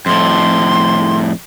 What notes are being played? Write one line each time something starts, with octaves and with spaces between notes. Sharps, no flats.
F2 A2 C6